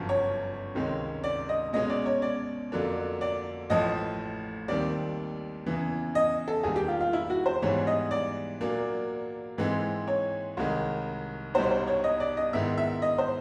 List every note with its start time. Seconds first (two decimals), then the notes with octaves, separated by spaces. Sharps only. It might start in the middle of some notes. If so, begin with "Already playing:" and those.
Already playing: G1 F#2 C#3 F3
0.09 C#5
0.75 C#2 C3 D#3 G#3 C#4
1.24 D5
1.49 D#5
1.73 B2 G#3 C#4 D#5
1.90 D5
2.06 C#5
2.22 D5
2.72 F2 D3 F#3 A#3 D4
3.21 D5
3.70 A1 A2 F3 D#5
4.68 D#2 D#3 G3 C4 D5
5.66 E2 C#3 E3
6.15 D#5
6.48 A4
6.63 E1 D#2 D#3 G3 G#4
6.76 G4
6.88 F4
7.00 F4
7.13 E4
7.30 F#4
7.46 C5
7.62 G#2 E3 G3 B3 C#5
7.87 D#5
8.11 D5
8.60 A#2 F#3 A#3 D4
9.58 G#2 E3 G#3 C4
10.08 C#5
10.57 C2 C3 D#3 G#3
11.54 C2 B2 G3 B3 D#4 C5
11.71 C5
11.87 C#5
12.04 D#5
12.20 D5
12.37 D#5
12.53 G#2 D#3 G#3 B3 E4 E5
12.78 E5
13.02 D#5
13.18 C5